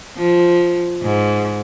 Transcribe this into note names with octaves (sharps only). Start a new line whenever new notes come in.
F3
G#2